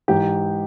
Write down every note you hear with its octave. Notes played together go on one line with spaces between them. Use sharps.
G#2 E3 G4